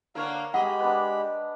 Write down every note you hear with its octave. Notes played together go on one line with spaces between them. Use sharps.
D3 A#3 D4 A#4 C#5 F5
G#3 G4 D#5 F#5 B5
B3 D4